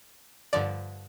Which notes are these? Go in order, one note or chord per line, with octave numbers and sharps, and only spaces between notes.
G2 D3 F3 D5